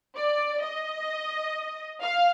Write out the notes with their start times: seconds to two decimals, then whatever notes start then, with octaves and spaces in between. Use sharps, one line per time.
0.16 D5
0.62 D#5
2.02 F5